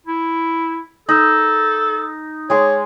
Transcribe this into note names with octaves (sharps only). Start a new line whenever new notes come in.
E4
D#4 A4
G#3 G#4 C#5 D6